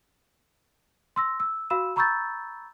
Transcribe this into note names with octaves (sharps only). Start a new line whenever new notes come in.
C6 E6 A#6
E6
F#4 F5 B5 E6 E7
A#5 B5 C#6 E6 G6 A6